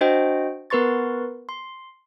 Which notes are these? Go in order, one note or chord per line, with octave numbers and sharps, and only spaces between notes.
D4 F#4 C5 D#5 G5
B3 A#4 B4 C6 C#6 A6
C6